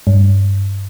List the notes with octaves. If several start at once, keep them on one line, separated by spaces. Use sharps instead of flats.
G2